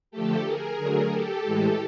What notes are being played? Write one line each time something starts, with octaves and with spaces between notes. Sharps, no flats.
D3 F3 A3 G4 A4
G#4 A#4
D3 F#3 A3
G4 A4
A2 E3 G#3